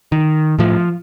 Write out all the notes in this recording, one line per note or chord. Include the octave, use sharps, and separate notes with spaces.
D#3
A2 F3